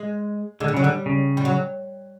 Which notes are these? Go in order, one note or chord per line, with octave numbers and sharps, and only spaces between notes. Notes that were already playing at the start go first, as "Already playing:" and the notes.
Already playing: G#3
D3 G#3
G3
C#3 F#3
D3 G3
C#3
G3
F#3